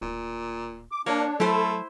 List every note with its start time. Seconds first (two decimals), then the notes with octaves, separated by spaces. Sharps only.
0.01 D1 A#2
0.92 D6
1.06 A#3 D4 C#5
1.40 F#3 A3 E4 A4 C5